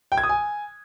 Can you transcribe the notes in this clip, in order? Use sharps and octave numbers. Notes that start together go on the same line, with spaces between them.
G5
G#6
D#6
G#5